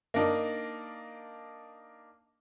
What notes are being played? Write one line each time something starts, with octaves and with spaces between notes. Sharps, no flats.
A#3 D4 D#4